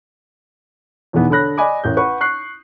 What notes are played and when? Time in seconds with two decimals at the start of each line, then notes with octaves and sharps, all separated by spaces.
1.13 E2 B2 D#3 E3 B3
1.29 D3 A4 C#5 B5 F#6 A#6
1.57 D5 D#5 G#5 B5 D6
1.84 A1 A#4 G6
1.97 B4 F#5 C#6
2.21 C#6 F#6 C7